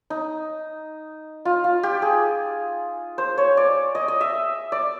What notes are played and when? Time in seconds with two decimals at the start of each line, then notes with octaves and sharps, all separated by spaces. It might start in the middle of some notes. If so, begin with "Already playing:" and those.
0.10 D#4
1.45 F4
1.64 F4
1.83 G4
2.02 G#4
3.18 C5
3.38 C#5
3.57 D5
3.95 D#5
4.08 D#5
4.21 E5
4.72 D5